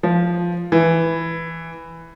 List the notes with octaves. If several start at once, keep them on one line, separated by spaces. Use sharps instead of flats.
F3
E3